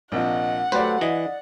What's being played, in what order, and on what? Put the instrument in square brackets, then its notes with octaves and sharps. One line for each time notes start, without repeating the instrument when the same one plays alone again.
[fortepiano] A#1 C3 F3 [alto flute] D#5 [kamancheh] F#5
[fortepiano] F#3 G4 D5 [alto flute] A3 [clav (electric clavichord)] B4 C5
[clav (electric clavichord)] E3 [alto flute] D5 [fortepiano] D#5